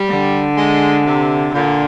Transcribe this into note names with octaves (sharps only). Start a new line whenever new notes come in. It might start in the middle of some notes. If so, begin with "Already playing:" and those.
Already playing: G3
D3
G#3
C3
A#2 D3